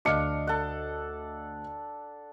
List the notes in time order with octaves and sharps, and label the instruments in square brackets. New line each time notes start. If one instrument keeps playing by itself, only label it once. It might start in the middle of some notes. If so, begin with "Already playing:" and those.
[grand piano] D2 D#5 C#7 [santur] D4 F5
[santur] A4 F#5